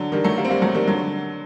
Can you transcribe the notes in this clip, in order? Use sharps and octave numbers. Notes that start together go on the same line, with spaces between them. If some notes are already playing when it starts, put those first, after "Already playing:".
Already playing: D3 F#3
D#3 G3
F#3 A3
G3 A#3
C4
G3 A#3
F#3 A3
D#3 G3
D3 F#3